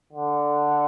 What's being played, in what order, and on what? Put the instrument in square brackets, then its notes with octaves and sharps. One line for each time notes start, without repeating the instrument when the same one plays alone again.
[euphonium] D3